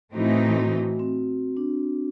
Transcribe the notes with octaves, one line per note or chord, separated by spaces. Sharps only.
A2 E3 A3 C4 D#4 F#4
F#4
C4
D4